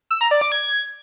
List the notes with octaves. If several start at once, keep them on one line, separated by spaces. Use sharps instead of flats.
E6
A#5
D5
D6
G#6